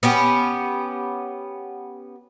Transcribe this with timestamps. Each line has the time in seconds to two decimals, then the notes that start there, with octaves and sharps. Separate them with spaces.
0.03 B3 C#4 G4